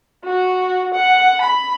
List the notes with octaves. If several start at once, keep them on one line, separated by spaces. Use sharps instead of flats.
F#4
F#5
B5